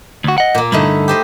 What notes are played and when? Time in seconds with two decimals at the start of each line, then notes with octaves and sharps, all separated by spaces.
0.24 D2 F#4
0.38 D#5 F#5
0.55 A#2 A#3
0.72 G2 D3 A3 D#4 E4
1.08 G4 C5 D#5